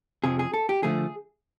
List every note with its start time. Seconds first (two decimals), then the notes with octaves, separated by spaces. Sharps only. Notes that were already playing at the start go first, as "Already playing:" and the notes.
0.24 F2 C3 F3 G#4
0.39 G#4
0.54 A4
0.69 G4
0.83 D3 F3 A3 G#4